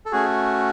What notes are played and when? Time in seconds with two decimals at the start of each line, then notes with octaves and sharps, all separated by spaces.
0.06 A4
0.12 A3 C#4 F#4 G#4